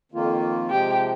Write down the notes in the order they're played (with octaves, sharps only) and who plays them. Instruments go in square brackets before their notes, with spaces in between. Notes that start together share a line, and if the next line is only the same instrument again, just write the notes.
[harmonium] F2 D#3 A#3 F4
[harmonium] C3 F3 G#3 [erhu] G4